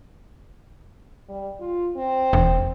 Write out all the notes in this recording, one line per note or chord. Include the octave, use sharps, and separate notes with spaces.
G3
F4
C4
E1